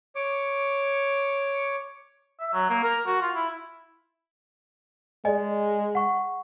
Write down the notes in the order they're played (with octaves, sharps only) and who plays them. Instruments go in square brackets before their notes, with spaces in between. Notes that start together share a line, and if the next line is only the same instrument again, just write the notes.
[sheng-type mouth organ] C#5 D6
[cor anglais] E5
F#3
A#3
A#4
F#4
F4
E4
[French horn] G#3 [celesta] D5 D#5 G#5
[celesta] F#5 C#6